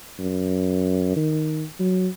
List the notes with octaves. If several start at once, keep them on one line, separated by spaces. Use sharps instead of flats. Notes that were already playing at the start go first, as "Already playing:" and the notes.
F#2
D#3
F#3